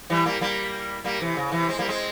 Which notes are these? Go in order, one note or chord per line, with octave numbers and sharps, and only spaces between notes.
E3 G3
G3 A#3
G3 A#3
G3 A#3
C3 E3
C#3
C3 E3
G#3 C4
G3 A#3
G#3 C4